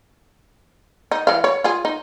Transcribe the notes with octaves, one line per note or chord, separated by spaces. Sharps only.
D#4
E3 F5
C#5
F4 G#4
D#4